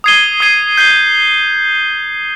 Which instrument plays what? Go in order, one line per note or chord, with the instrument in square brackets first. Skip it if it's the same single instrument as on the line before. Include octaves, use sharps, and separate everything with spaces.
[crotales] D#6 G#6 C7 D#7 G7
D#6 G#6 C7 D#7 G7
G6 C7 G7